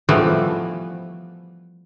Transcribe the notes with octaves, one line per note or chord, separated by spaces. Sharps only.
E3 F3 G3 A3 B3